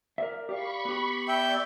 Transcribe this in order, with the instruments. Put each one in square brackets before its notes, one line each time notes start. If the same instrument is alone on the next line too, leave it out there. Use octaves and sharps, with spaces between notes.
[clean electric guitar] A#4 D5 E5
[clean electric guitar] G4 D5 F5 [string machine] B5 C#6
[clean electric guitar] B3 G4
[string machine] D5 [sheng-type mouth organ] E5 G5